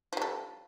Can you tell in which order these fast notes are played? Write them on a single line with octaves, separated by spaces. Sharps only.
F3 G3 A4